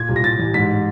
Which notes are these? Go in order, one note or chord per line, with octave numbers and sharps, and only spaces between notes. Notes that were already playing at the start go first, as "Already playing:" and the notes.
Already playing: A#2 G#6
C2
A#6
A2 A6
A1
G#2 B6